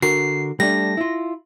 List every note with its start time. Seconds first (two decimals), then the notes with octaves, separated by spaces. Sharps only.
0.02 D3 F#4 A#4 C7
0.60 G3 A3 D4 A#6
0.97 E4 F4